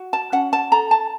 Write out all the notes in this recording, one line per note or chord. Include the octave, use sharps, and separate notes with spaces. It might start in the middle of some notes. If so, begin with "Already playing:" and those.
Already playing: F#4
A5
C#4 F#5
A5
A4 A#5
A5